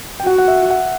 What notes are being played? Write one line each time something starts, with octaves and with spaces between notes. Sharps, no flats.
G5
F#4 F#5
F#5
E5
F#5